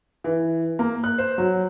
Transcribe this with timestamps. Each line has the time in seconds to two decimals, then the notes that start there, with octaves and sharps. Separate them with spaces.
0.24 E3
0.79 A#3
1.04 F#6
1.18 C5
1.38 F#3